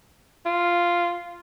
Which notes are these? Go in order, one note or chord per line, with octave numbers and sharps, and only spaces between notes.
F4